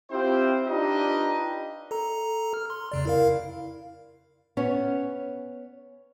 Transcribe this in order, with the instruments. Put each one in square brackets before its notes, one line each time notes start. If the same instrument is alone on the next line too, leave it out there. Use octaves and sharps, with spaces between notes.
[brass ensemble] C4 E4 F4 G4 C5
D4 D#4 F4 G4 B4 D#5
[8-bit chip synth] A4 A#5
F6
C6
F2 C#3 D5
E4 A#4 F5
[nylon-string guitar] B3 C#4 C#5